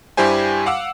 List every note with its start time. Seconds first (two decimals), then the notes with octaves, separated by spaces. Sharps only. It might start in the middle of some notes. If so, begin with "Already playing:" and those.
0.17 G2 G3 E4 G4 C5 G#5
0.66 F5 F#5 D6 E6